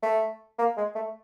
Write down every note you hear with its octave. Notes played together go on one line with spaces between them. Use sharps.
A3
A#3
G#3
A3